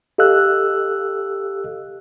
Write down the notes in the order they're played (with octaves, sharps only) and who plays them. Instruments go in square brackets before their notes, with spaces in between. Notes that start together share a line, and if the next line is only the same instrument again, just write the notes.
[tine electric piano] G4 A4 D#5 F5 E6 F#6